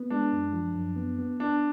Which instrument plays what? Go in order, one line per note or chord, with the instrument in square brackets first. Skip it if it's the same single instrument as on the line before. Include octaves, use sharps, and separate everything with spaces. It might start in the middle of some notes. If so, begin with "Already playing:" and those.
Already playing: [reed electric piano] B3
[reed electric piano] G#3 [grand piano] D4
[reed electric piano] F#2
F3
F#2
B3
B3
[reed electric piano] B3 [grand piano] D4